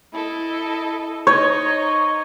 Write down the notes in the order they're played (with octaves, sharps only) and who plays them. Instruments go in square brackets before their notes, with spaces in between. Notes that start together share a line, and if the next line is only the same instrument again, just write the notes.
[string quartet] E4 A4 D#5
[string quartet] D#4 D#5 [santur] C#5